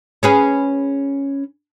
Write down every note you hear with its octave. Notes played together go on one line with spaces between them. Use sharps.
C#4 G#4 B4